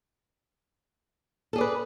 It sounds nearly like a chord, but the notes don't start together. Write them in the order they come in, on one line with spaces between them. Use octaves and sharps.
A4 G#4 D5 B4